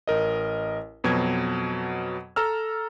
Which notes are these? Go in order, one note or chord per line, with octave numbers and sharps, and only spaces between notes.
A1 A#4 D#5
F2 B2 F#3 G#6
A4 A#5 E6 F6